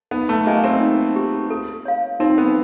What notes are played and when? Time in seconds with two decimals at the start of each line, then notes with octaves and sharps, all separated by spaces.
0.11 B3 D#4
0.29 A3
0.46 A#3 G4 C5 D#5 G#5
0.64 C4
0.81 D#4
1.16 G4 B4
1.50 A4
1.85 C#5 F5
2.20 C4 D#4
2.38 B3